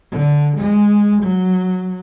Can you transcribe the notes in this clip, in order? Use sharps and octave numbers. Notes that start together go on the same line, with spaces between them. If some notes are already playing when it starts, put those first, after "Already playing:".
D3
G#3
F#3